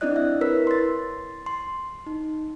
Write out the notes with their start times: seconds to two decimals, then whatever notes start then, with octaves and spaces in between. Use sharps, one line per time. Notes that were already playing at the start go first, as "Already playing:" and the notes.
0.01 C4 D4 E4 D5 D#5 F#6
0.16 E5
0.41 E4 A#4 B4 C#5 E6 B6
0.67 C6 A6
1.46 C6
2.06 D#4